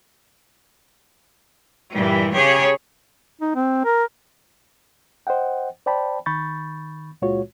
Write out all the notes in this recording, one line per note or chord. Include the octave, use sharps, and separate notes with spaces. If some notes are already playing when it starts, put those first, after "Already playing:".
G2 A#2 E3 G3
C#3 G4 G#4 C#5
D#4
C4
A#4
C5 D#5 F#5 G5
C5 D5 G5 A5 B5
D#3 B5 C#6 G6 A6
C#2 A#2 G#3 F4 F#4 C#5